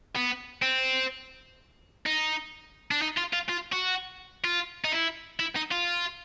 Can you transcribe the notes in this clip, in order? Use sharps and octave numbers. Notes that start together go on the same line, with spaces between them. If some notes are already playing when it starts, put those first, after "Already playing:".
B3
C4
D#4
D4
D#4
F4
F4
F4
F#4
F4
D#4
E4
E4
D#4
F4